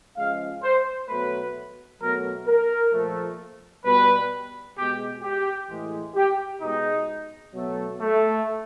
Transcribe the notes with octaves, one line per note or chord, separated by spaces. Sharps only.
C#3 F3 G#3 F5
C5
B2 F#3 A3 B4
B2 F#3 A3 A#4
A#4
A#2 F3 A3
B2 G3 B4
B2 G#3 G4
G4
A2 E3 G#3
G4
B2 G#3 D#4
B2 F#3 A3
A3